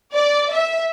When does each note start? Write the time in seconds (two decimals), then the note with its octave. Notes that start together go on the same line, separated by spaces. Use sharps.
0.14 D5
0.52 E5